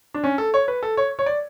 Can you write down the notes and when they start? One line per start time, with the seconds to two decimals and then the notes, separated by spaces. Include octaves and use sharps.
0.14 D4
0.24 C#4
0.38 A4
0.54 C#5
0.68 B4
0.83 A4
0.97 C#5
1.19 C#5
1.26 D5